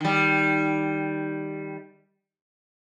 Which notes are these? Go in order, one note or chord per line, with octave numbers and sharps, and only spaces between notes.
D#3 G3